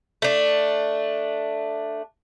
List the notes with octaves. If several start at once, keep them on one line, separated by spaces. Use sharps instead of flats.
A3 D4